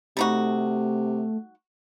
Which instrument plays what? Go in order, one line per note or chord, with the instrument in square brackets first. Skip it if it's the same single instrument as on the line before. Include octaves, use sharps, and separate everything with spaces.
[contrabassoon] C3 [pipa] G3 D#4 F#4 [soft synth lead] A3